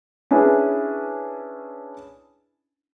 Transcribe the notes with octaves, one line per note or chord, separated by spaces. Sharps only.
C#4 D4 E4 G#4 B4